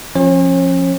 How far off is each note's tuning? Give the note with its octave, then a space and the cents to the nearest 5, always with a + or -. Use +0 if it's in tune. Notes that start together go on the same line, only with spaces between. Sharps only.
F3 +0 C#4 -35 C#5 -45